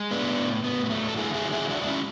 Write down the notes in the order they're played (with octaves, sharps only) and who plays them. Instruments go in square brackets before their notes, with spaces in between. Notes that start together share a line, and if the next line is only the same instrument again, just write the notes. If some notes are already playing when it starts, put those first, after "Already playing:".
Already playing: [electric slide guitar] G#3
A2 B3 D4
A2
A2 B3
B3
F#3 A3
A4
D3 E4 G#4
E4 G#4
F#3
E4 G#4
G#3 D4 F#4
D4
C#4 E4